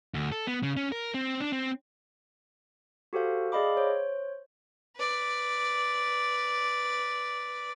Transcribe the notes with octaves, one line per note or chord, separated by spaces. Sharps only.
D2
A4
B3
C#3
C#4
A#4
C4
D4
C4
F#4 G4 A4 C5 F5
G#4 D5 D#5 F5 B5 D6
C5 C#5
B4 D5